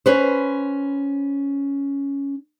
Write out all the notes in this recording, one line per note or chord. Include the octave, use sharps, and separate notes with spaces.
C#4 B4 C5